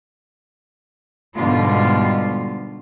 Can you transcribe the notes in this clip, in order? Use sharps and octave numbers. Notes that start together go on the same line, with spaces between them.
G#2 B2 D3 G3 F4